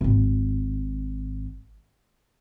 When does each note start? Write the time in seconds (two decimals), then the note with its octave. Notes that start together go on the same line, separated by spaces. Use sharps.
0.01 D1 G#1